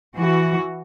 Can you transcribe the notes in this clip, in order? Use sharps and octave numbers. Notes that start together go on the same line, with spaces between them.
E3 F#4